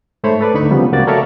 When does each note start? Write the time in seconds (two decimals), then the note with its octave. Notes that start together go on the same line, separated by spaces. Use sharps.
0.23 G#2 A3 C5 C#5 B5
0.41 A4 B4 D5
0.54 D2 D3 D#4 B5 C#6
0.71 C#3 F3 G3 B3
0.93 C#2 A#3 F#4 D5 A6
1.08 A4 A#4 C#5 D5 E5 F5